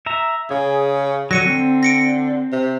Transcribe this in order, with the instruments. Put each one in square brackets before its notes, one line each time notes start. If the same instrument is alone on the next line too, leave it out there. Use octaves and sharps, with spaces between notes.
[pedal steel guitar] E5 A#5
[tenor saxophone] C#3 [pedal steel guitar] G#4
[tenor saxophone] D3 [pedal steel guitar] F#3 [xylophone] A#6 C#7 D#7
[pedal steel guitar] C4
[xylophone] A#6 C#7 D7
[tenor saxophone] C3